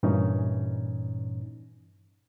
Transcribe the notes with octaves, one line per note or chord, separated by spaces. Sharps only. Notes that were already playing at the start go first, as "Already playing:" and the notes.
G2 A#2 E3 C#4 D#4